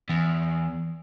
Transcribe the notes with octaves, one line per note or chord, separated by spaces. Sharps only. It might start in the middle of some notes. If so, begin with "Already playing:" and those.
E2